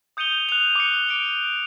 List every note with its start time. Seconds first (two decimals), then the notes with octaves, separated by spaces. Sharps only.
0.17 D#6 G6 C#7 D#7 F7 G7
0.49 F#6 F7
0.75 D6 C#7
1.09 D7 F7